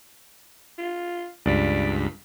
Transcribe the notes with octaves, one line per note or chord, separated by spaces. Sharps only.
F4
C#2 G2 D5 B6